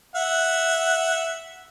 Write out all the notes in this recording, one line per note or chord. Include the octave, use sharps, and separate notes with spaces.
E5 F#5